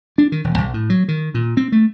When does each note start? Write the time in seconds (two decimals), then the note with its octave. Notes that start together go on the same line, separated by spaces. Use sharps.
0.18 D4
0.32 D#3
0.44 E1
0.58 B1
0.74 A2
0.90 F#3
1.08 D#3
1.34 A#2
1.57 C4
1.72 A3